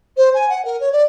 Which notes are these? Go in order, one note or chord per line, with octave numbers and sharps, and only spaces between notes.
C5
G#5
F#5
A#4
C#5
D5